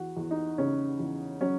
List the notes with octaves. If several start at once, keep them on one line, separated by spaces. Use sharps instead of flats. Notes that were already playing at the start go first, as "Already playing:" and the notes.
Already playing: E2 F#4
E2
D#4
C#3 C#4
E2
F#3 C#4